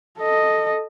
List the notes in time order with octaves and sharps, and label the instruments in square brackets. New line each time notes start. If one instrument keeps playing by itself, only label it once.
[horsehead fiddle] A4 D#5